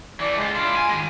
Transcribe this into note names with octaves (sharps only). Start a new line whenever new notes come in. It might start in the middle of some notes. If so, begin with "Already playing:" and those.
E3 A3 D5
C#2 G#3 F4
D4 E4 F4
G#5
D#3 G#3